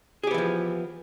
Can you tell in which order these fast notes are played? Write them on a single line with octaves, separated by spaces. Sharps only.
G#4 G4 B3 E3 F3